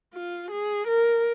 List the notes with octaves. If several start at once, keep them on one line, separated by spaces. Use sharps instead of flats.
F4
G#4
A#4